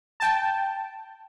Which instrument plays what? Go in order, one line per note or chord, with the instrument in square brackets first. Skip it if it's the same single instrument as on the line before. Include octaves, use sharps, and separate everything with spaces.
[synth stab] G5 A5